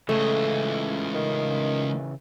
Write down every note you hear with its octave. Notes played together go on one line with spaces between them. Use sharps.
C#2 C#3 E3 A3 D#5
D#3